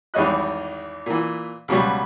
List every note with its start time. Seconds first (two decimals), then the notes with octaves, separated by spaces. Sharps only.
0.14 G#1 E2 G3 C#5 D#5 F#6
1.06 A#2 E3
1.68 C#2 B2 F#3 G3